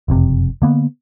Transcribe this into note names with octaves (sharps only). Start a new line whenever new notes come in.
F#1 F2 C3
D3 A#3 B3